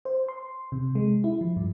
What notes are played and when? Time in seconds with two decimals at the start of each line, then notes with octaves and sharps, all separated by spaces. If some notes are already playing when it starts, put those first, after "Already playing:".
0.05 C5
0.28 C6
0.72 C3
0.95 G#3
1.24 E4
1.41 F3
1.56 G2